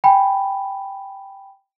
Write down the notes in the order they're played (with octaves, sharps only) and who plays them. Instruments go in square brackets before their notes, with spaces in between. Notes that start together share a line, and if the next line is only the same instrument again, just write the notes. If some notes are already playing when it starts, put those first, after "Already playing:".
[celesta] G5 G#5 B5